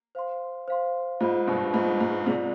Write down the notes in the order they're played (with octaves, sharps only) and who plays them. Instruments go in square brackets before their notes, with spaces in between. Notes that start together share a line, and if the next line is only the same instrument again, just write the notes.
[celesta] C5 F5 C6
C5 F5 C6
[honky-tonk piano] G#2 [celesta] F4 C5 D#5 B5
[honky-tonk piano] G2 B2
[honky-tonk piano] G#2 [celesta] F4 C5 D#5 B5
[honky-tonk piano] G#2
[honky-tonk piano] G#2 C3 [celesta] F4 G#4 D5